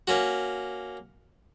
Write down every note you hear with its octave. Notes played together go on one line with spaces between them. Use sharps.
A#3 C#4 F#4